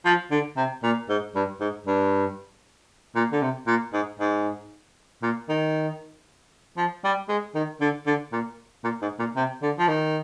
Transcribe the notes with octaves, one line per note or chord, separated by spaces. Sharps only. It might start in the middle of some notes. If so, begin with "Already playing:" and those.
F3
D3
C3
A#2
G#2
G2
G#2
G2
A#2
D3
C3
A#2
G#2
G#2
A#2
D#3
F3
G3
G#3
D#3
D3
D3
A#2
A#2
G#2
A#2
C3
D3
F3
D#3